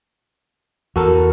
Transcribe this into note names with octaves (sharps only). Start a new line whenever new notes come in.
E2 F#4 A4 A#4